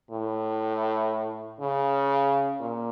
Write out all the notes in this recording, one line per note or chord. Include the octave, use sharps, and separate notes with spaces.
A2
C#3
A#2